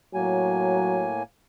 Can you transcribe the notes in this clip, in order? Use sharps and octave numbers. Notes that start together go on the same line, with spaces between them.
A2 F#3 A#3 G#5